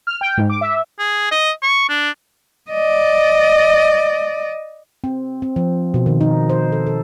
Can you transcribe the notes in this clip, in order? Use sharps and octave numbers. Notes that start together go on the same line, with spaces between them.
F6
G5
G#2
D6
E5
G#4
D#5
C#6
D4
D5 D#5
C4
C4
F3
B2
D#3
D#4
C5
A4
A4